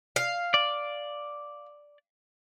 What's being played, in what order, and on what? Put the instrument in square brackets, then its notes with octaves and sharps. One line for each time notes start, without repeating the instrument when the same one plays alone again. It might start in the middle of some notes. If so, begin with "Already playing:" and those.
[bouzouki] F5
[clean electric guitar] D5